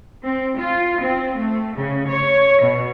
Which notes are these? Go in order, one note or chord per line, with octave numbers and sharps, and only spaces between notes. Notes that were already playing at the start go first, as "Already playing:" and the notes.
C4
F4
C4
A3
C#3
C#5
B2